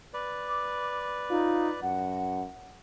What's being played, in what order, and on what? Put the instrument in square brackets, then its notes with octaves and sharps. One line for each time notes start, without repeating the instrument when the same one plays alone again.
[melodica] B4 D5
[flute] D6
[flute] D#4 [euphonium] F4
[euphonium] F#2 [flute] F#5